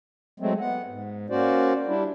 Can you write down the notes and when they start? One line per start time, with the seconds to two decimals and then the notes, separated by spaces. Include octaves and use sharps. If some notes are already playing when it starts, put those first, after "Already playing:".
0.40 F#3 G#3 A3 C4
0.60 B3 F#5
0.87 G#2
1.30 A#3 C#4 F#4 C5 D5
1.87 G3 D4 E4